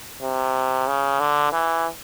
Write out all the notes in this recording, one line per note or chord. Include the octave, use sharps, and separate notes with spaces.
C3
C#3
D3
E3